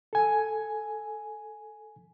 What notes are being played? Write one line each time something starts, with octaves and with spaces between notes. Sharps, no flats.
A4 G#5